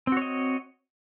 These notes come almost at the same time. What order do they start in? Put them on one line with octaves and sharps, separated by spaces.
C4 F#4 C#5 D#5